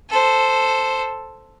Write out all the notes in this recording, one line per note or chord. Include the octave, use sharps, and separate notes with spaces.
A4 C5